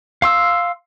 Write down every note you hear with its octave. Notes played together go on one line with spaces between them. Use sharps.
F5 C6 E6